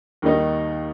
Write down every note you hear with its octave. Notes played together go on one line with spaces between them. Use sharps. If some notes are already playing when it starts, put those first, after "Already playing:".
D#2 D#3 G3 D#4